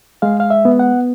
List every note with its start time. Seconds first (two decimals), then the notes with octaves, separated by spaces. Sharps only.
0.22 G#3 F5
0.40 F5
0.50 E5
0.65 B3
0.79 F#5